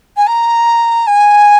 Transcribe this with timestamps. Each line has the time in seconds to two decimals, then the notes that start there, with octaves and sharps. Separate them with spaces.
0.16 G#5
0.27 A#5
1.07 G#5